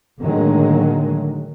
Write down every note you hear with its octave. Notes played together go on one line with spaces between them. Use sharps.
A2 D3 D#3 F#3 G#3 A#3